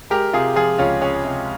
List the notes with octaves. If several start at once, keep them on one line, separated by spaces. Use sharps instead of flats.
G#3 G4 A#4
C3 F4 G#4
F3 F4 G#4
C#2 C#4 F4
G#3 C#4
C3